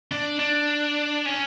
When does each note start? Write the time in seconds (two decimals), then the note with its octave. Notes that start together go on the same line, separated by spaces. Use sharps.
0.12 D4
0.39 D4
1.26 C#4